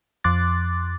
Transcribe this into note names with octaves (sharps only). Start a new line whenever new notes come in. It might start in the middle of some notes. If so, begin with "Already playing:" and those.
F2 F3 C6 D6 F#6 A6